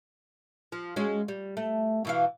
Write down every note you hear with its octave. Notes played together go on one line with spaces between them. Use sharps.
F3
G#3 C#4 F#4
G3
A3
B2 E3 F5